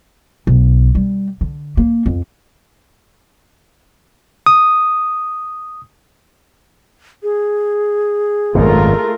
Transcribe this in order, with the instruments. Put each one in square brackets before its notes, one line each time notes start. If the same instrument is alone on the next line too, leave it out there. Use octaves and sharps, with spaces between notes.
[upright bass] B1
G3
D3
A#3
F2
[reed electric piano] D#6
[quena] G#4
[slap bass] G#1 F#2 B2 [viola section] A3 F4 A#4